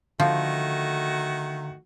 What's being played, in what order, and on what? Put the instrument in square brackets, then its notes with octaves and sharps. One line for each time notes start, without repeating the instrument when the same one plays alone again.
[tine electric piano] D3 F5 [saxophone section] D#3 A3 F#4 [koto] F3